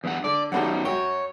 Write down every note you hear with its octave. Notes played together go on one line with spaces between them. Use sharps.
E2 G2 F#5
D3 D5
F#2 B2 D#3 G3 A4 F#5
F#2 F#4 C#5 G5